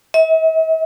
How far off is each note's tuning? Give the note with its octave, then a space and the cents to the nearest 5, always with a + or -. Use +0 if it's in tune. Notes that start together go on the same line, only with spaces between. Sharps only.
E5 -45